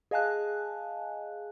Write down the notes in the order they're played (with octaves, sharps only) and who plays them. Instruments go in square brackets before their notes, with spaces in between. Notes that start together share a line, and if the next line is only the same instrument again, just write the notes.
[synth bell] G#4 D#5 F5 G#5 A5 F#6